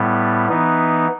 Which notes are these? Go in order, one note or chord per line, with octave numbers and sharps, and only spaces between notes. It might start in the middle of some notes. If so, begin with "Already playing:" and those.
Already playing: A2 G3 B3
E3 B3 D#4